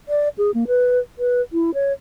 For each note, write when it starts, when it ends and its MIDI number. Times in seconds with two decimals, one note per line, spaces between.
0.09 0.29 74
0.38 0.51 68
0.54 0.64 58
0.67 1.00 71
1.19 1.41 71
1.53 1.71 64
1.74 1.93 73